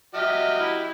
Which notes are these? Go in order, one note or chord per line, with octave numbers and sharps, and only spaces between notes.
F#3 G4 D#5 E5 F6
E4